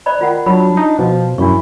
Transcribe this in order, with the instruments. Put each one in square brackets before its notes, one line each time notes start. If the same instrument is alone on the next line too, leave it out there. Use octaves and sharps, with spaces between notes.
[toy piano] C5 D5 B5
[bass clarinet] D#3 [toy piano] F4 F#5
[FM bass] F#3 [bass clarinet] D4 [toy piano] F4 B5
[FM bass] D#4
[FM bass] B2 [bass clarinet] F3
[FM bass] F#2 [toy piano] D4 C#6 [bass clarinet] E4